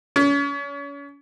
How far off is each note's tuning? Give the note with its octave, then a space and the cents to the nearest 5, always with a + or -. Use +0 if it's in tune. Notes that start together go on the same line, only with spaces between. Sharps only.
C#4 +35